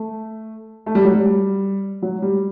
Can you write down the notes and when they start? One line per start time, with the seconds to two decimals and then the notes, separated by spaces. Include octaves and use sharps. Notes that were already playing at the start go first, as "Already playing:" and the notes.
Already playing: A3
0.86 A3
0.95 G3
1.05 F#3
1.14 G3
2.02 F#3
2.22 G3